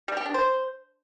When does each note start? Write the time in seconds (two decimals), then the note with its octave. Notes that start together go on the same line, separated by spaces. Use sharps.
0.08 G3
0.17 G4
0.26 D4
0.34 C5